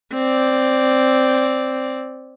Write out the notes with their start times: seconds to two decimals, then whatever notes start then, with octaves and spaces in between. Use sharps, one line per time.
0.14 C4 D5